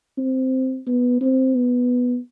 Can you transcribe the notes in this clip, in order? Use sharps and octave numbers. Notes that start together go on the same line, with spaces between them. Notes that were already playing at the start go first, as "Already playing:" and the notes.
C4
B3
C4
B3